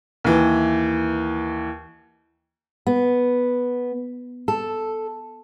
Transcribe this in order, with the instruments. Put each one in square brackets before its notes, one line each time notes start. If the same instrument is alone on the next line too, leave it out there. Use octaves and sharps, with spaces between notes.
[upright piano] D#2 E3
[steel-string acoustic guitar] B3
A4